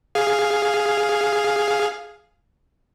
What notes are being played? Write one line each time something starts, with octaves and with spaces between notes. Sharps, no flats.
G#4 F5